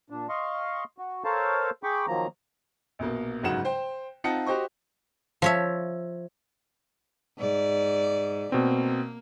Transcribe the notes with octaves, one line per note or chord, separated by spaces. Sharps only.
A#2 D4
D#5 F5 C6 C#6
F#4
A4 A#4 C5 C#5 F5 A5
G#4 G5 B5 C#6 D6
D#3 F3 F#3 A#3 A#5
A#1 B2 A#3
G1 G#2 C#3 F#3 F#5 E7
C5 G5
C4 D#4 F4 F#5 A5 C#7
F#4 G4 C5 D#5 C#6
F3 C#5 E5
G#2 D5
B2 A#3 C4